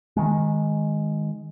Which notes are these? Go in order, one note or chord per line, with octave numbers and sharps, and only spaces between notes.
D#3 G#3